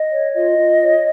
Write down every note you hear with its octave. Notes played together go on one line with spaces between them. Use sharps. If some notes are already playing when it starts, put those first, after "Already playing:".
Already playing: D#5
C#5
F4 D#5
F4
C#5